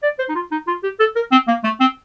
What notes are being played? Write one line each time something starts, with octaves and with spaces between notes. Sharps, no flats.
D5
C5
D#4
F4
D#4
F4
G4
A4
A#4
C4
A#3
A3
C4